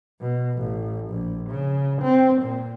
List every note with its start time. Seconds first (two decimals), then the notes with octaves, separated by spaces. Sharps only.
0.21 B2
0.59 A1
1.09 A#1
1.50 C#3
2.02 C4
2.42 A#2